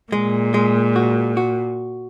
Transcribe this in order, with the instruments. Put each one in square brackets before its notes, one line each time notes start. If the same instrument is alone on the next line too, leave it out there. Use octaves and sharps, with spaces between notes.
[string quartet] A#2 [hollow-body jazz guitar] G#3
[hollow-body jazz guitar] G#3
F#4
F#4